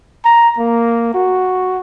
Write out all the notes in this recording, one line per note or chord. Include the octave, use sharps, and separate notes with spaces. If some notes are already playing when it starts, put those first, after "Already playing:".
A#5
A#3
F#4